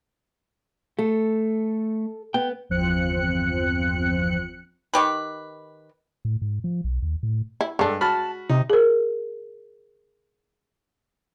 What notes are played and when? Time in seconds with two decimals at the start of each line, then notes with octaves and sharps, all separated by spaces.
0.99 A3 A4
2.34 B3 G5
2.69 G1 E2 F3 C4 F#6 C#7
4.94 D#3 G4 B4
6.25 A2
6.42 G#2
6.64 F3
6.84 B1
7.02 D#2
7.23 A2
7.61 E4
7.79 G2 G#3 D4 A4
8.01 F#4 A5 B5 F6
8.49 C3 D#4
8.70 G#4 A#4